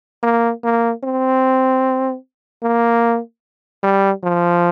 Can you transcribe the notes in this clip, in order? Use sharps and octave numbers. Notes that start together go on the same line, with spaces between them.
A#3
A#3
C4
A#3
G3
F3